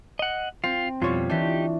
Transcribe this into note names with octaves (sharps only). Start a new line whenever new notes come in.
D#5 F#5
C4 F4
F2 B2 G3 F4 C#5
E3 D4 D#4 G4